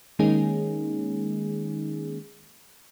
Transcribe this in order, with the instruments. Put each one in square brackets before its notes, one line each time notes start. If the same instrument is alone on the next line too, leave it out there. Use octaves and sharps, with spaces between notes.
[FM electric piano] D#3 G#3 A#3 C#4 D#4 G#4